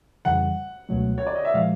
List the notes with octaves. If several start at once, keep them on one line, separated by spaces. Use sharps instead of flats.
F2 C#3 E3 G3 F#5
C#2 B2 F#3 A3
C#5
D5
D#5
E5
A#2 F3 G#3 F5